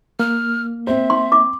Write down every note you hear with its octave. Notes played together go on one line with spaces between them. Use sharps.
A#3 F6
C4 C5 E5
C6
D6